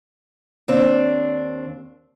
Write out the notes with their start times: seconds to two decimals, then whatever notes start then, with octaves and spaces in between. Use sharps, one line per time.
0.68 D#2 C4 D4